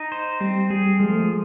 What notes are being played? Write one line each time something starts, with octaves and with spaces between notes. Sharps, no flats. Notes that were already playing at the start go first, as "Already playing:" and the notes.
Already playing: D#4
C5
G3 C4
G3 G#4
F3 G#3
A3
G#3